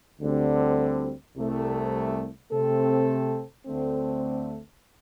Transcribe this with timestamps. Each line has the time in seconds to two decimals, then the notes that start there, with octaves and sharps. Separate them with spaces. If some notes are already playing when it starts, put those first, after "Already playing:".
0.21 D2 D3 G3 C4
1.36 C2 C3 A3
2.52 C3 A3 C4 A4
3.66 D2 D3 A3 C4